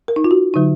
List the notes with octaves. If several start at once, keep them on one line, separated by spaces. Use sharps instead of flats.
A#4
D#4
F4
F#4
D3 F#3 D#4